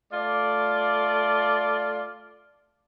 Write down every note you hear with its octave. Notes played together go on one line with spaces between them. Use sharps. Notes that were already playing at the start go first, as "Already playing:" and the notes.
A3 F4 D5